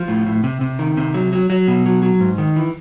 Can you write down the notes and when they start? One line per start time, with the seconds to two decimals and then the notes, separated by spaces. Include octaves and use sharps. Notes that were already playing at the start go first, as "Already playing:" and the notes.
Already playing: F3
0.08 A2
0.27 A2
0.44 C3
0.61 C3
0.79 D#3
0.97 C3
1.14 F#3
1.32 F#3
1.50 F#3
1.68 B2
1.86 F#3
2.03 F#3
2.20 G#2
2.38 D#3
2.56 E3